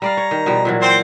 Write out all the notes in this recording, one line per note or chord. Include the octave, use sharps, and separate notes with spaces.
G3 D5 F5 A#5
C#5
D#3
B2 F3 G3
A#2 E3 F#3
C4 C5